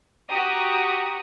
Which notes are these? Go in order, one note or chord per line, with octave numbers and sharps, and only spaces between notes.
F#4 G4 A#5 D#6